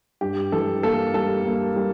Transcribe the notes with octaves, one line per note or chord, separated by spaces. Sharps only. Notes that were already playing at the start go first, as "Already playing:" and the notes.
G2 G4
E3 A4
A#3 A4
G3 A4
A#3
G3